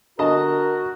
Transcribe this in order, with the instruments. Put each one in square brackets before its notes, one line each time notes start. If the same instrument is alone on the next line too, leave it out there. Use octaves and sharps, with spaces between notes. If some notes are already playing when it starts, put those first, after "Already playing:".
[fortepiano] D3 D#5 A5 [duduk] F#4 [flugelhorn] A#4